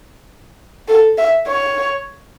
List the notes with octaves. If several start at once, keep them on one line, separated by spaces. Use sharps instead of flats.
A4
E5
C#5